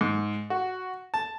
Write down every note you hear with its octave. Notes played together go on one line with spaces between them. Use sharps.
G#2
F#4
A5